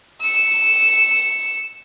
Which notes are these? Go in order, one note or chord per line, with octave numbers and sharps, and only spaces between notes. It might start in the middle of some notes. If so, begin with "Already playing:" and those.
E6 C#7